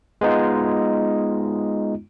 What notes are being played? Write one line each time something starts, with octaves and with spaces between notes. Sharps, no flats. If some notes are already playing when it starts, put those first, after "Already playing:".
G#3 B3 D#4 F4